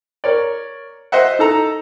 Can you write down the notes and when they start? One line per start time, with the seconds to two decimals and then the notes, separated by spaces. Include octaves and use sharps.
0.24 A#4 C#5 D5
1.12 C5 D#5 E5 F#5
1.39 D#4 A4 A#5